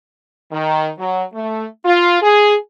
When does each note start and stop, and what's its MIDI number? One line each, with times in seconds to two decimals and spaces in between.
0.52 0.89 51
0.99 1.23 54
1.34 1.65 57
1.85 2.21 65
2.22 2.55 68